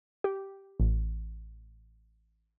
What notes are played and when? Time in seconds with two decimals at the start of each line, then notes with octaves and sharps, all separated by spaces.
0.24 G4
0.80 A1